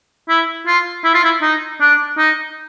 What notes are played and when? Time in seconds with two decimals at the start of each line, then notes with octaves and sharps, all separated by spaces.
0.29 E4
0.67 F4
1.04 E4
1.14 F4
1.24 E4
1.42 D#4
1.81 D4
2.18 D#4